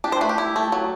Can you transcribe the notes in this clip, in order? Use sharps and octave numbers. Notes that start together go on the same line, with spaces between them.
D4 G4
C5
A3 B4
G4
E4
A3
F#3